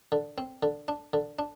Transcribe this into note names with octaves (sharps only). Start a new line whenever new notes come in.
D3
C4
D3
D4
D3
D4